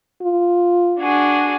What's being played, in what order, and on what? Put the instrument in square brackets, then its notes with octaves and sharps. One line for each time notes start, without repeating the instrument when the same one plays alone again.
[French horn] F4
[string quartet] D4 F#4 G#4